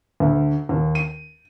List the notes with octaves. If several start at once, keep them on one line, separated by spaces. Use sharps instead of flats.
D2
D#2
D#7